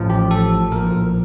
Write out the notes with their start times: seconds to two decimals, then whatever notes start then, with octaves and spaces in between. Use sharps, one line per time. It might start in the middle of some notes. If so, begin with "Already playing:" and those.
Already playing: A1 A2 F3
0.10 G4
0.31 A4
0.72 A#1 A#2 F3 A#4